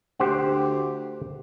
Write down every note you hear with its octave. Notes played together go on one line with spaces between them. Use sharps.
D2 G4 C5 F#5